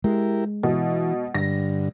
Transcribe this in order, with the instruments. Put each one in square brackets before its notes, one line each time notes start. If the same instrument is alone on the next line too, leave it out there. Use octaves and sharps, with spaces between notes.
[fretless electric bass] G#3 [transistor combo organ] E4 G4 A#4
[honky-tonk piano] B2 [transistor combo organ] E3
[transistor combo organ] G2 D3 [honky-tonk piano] A#6